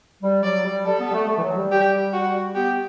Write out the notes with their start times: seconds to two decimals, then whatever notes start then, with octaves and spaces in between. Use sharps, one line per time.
0.22 G3
0.43 F#3 D5
0.65 G3
0.86 G3 A4
1.00 B3
1.09 G3
1.14 A3
1.29 A3
1.38 E3
1.42 F#3
1.57 G3
1.71 G4
2.13 F#4
2.55 B3 G4